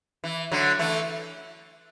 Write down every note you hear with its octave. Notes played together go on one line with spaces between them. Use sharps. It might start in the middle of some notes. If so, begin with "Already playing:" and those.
E3
D3 F#3
E3 A3